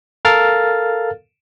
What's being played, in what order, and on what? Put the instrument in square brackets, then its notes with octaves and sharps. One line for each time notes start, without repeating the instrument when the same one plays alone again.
[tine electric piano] A4 A#4 F5 F6 A6